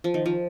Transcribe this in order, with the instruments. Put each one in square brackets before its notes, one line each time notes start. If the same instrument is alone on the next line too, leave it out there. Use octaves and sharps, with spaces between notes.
[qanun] F3
D#3
F3